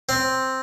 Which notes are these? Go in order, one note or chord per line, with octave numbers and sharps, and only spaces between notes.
C4